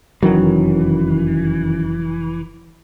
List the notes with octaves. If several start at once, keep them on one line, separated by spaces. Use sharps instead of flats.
F1 F#2 D#3 E3 F#3